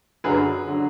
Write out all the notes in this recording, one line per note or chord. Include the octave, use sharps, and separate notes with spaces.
F#2 D3 F#3 G#4 B4
D3 F#3